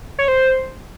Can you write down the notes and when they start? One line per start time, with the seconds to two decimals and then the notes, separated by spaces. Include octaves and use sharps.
0.19 C#5
0.28 C5